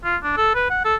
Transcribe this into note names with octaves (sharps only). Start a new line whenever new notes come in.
F4
D4
A4
B4
F#5
A4